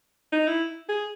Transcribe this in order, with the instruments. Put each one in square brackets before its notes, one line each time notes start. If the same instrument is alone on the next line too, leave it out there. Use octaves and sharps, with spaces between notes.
[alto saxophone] D#4
E4
G#4